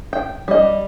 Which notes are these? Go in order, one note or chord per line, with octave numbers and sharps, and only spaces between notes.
G5
G3 D#5